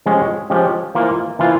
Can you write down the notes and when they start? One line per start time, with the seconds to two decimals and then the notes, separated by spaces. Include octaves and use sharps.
0.06 F3 G#3 C#4 G4
0.50 F3 G#3 C#4 G4
0.95 E3 A#3 F4 C5
1.39 E3 A#3 F4 C5